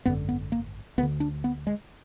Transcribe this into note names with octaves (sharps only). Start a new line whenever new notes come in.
G#1 F#2 D3 B3
B3
A#3
D2 D3 B3
D4
B3
G#3